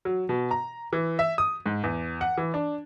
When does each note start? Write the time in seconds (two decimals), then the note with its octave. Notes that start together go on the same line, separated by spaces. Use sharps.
0.05 F#3
0.29 B2
0.51 A#5
0.93 E3
1.19 E5
1.38 D#6
1.66 G#2
1.83 E2
2.21 F#5
2.37 E3
2.54 D4